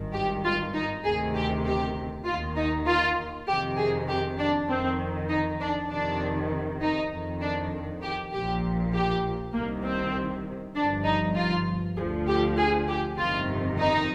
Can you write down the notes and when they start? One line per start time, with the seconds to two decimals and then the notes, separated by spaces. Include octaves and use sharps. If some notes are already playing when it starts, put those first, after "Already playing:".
Already playing: G#1 G2 D#3
0.14 G4
0.44 F4
0.75 D#4
1.05 D2 C3 D#3 G#4
1.35 G4
1.65 G4
2.26 D#2 D#3 F4
2.56 D#4
2.87 F4
3.47 F2 C3 D#3 G4
3.77 G#4
4.08 G4
4.38 D4
4.68 F2 D#3 C4
5.29 D#4
5.60 D4
5.90 F2 C3 D#3 D4
6.81 D#4
7.11 F2 D#3
7.41 D4
8.02 G4
8.33 A#1 A#2 F3 G4
8.94 G4
9.53 C2 C3 D#3 A#3
9.84 C4
10.75 G1 G2 F3 D4
11.05 D#4
11.35 F4
11.96 D2 D3 F3 G#4
12.27 G4
12.57 G#4
12.88 G4
13.18 G1 F2 C3 D#3 F4
13.78 D#4